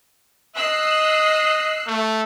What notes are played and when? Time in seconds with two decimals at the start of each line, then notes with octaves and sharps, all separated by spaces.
0.56 D#5 E6 F#6 C7
1.87 A3